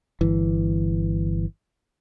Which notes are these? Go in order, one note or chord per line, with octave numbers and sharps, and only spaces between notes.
G1 E3